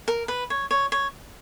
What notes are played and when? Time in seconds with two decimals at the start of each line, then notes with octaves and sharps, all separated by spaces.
0.08 A#4
0.28 B4
0.50 C#5
0.71 C#5
0.92 C#5